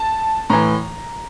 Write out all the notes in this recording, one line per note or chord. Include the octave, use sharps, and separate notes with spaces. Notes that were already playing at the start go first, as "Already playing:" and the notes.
Already playing: A5
A2 E3 A#5